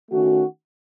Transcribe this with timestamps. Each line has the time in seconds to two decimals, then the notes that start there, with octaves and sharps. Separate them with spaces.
0.09 D#3 A3 C#4 F#4